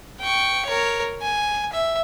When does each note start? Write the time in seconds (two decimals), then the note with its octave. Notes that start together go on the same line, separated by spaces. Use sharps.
0.20 G5 C#6
0.66 A#4 C#5
1.22 G#5
1.73 E5